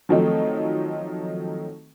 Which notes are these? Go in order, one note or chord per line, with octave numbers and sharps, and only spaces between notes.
D#3 F3 F#3 A3 C4 D#4